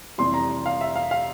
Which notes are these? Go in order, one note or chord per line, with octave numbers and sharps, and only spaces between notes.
F1 F2 C3 E3 G3 C6
A#5
F5
E5
F5
F5